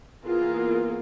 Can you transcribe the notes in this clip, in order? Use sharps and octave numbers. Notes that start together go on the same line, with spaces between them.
E3 A#3 B3 F4 G#4 A#4